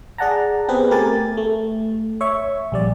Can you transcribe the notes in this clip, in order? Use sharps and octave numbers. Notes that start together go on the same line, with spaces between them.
G#4 D5 F#5 A5 A#5
B3 C4 G4 G#4 B4
A3 G4 A#4 G#5 A6
A3
C#5 E5 C#6
A#1 G3 D5